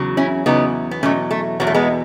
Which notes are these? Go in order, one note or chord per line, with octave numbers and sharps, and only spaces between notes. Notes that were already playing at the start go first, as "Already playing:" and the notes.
Already playing: E2 C#3 F#3
C#4 E4
E2 C#3 F#3 B3 D#4
B3
E2 B2 F#3 A3 C#4
A3
E2 B2 F#3 B3
A3
G#3 B3